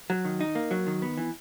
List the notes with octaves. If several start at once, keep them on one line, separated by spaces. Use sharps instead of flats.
F#3
D#3
D#4
A#3
F#3
D#3
B3
E3